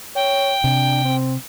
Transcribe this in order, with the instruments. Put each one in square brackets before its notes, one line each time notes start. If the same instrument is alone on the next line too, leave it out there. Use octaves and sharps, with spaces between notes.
[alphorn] C#5 [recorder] G5
[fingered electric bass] C3 [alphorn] D4
[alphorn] C4